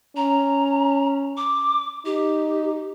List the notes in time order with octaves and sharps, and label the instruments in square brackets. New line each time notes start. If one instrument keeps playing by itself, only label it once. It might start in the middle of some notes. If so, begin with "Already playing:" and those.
[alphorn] C#4 [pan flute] A#5
[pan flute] D6
[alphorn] D#4 [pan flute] G4